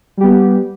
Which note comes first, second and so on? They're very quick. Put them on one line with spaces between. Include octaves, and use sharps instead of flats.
G3 G4 B3